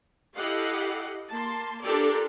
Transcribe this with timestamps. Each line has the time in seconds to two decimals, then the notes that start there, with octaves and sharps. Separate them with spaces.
0.36 E4 G4 A4 D#5 F5 F#5
1.30 A#3 A5 C6
1.83 D4 F4 G4 A4 A#4 D5